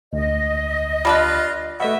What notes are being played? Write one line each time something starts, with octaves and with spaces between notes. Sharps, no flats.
D2 D#5
G3 D4 F4 B4
B2 A3 D#5 E5 F#5